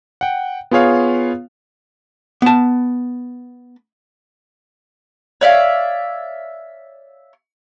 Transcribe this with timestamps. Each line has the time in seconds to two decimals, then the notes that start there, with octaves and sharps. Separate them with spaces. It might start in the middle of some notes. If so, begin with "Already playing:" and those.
0.21 F#5 G5
0.71 B3 F4 G#4 C#5 F5
2.42 B3 A5
5.41 C#5 D5 E5 F5